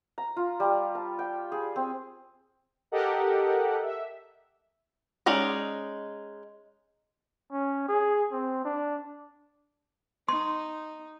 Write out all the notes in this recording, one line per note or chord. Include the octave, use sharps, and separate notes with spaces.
A#5
F4
G3
A5
G5
G#4
C4
G4 A4 A#4 D#5 F#5
E5
G#3 C#4 D#4 D5
C#4
G#4
C4
D4
D#4 C6